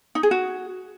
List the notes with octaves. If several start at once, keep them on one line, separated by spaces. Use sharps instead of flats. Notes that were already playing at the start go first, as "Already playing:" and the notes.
D#4
G#4
F#4